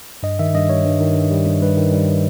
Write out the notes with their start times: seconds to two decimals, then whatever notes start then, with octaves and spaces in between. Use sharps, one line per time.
0.23 G2 D#5
0.39 D#3 E5
0.55 G2 D#5
0.69 G3 C#5
0.85 G2
1.00 D#3
1.16 G2
1.31 G3
1.46 G2
1.62 G2 B4
1.77 D#3
1.92 G3